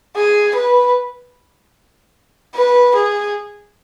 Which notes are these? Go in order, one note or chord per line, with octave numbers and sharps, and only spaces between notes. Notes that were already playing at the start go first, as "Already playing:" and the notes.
G#4
B4
B4
G#4